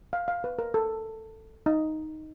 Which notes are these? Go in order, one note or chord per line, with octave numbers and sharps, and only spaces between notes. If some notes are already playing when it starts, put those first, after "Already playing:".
F5
F5
B4
A#4
A4
D#4